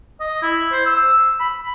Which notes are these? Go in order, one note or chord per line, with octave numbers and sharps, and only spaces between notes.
D#5
E4
C5
E6
B5